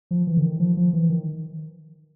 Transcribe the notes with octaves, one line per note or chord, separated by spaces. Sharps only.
F3
E3
D3
D#3
F3
F3
E3
D#3